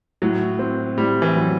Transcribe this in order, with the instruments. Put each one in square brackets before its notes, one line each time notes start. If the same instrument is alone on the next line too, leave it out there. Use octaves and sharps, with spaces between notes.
[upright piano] A2 [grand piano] F#3
[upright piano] C4
[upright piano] A2 [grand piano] G3
[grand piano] E3
[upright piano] F#3